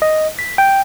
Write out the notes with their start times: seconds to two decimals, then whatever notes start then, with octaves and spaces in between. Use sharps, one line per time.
0.02 D#5
0.39 B6
0.58 G5